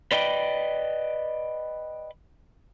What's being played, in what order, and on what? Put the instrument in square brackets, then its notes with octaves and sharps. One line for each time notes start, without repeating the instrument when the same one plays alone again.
[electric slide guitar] B4 D5 D#5 G5